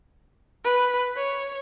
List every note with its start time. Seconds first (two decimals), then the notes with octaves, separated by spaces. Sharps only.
0.65 B4
1.17 C#5